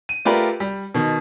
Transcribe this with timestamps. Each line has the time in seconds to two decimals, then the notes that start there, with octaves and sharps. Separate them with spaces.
0.09 D#7
0.25 A3 F4 G4 A#4 B4 D5
0.60 G3
0.94 B2 D#3